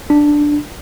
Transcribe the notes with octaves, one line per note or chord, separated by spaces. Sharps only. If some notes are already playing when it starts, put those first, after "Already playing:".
D4